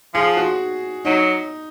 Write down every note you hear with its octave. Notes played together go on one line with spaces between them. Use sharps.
F3 G#4
F#4
F#3 D#4